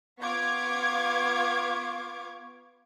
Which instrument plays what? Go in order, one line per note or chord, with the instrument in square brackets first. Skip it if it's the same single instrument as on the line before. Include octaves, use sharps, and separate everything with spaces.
[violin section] B3 F4 F5 C#6 D6 G#6